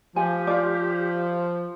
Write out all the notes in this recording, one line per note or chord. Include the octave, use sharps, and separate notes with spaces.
F3 G4 G#5
F4 D5